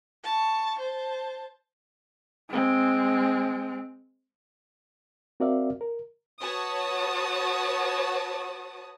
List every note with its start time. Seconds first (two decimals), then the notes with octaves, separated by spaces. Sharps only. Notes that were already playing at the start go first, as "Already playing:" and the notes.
0.24 A5 C#6
0.79 C5 A5
2.49 G#3 C4
5.40 C4 F#4 A#4 D5 E5 F5
5.81 A#4
6.41 F#4 B4 C#5 A5 D#6